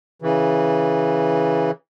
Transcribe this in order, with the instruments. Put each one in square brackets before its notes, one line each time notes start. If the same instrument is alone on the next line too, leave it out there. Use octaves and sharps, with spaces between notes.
[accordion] C#3 E3